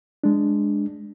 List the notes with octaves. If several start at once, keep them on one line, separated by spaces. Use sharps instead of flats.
G#3 D4